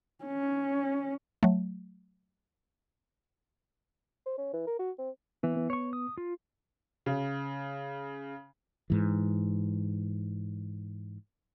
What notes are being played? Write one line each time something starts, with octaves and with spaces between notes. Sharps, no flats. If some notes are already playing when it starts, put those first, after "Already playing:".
C#4
F#3 A3
C5
C#4
E3
A#4
F#4
C4
E3 B3
B3
C#5 C#6
D#6
F4
C#3
G#2 E3